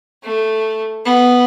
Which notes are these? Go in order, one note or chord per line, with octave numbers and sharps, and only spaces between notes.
A3
B3